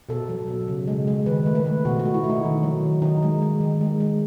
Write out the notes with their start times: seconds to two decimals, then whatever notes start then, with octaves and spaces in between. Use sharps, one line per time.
0.09 B2 A4
0.29 F#3
0.48 B2
0.68 C#3
0.87 G#3
1.07 G#3
1.26 D#3 B4
1.46 A3
1.55 B4
1.66 A3
1.85 B2 F#4
1.99 F#4
2.05 A3
2.14 E4
2.24 A3
2.29 D#4
2.43 D#3
2.63 F#3
2.83 D#3
3.02 D#3 D#4
3.23 G#3
3.42 G#3
3.61 D#3
3.81 G#3
4.00 G#3